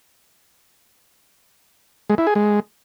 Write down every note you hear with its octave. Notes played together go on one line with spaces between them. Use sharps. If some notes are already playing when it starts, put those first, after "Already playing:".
G#3
E4
G#4
G#3